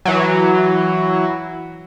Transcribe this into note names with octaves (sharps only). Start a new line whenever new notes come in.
E3 F#3